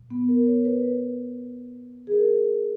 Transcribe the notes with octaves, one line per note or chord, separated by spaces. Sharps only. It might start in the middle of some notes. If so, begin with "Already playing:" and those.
Already playing: A#2
B3
A#4
C#5
B4
G#4
A#4